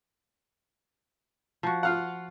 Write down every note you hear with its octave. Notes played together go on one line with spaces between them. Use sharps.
F3 F#4
F4 F5 F#5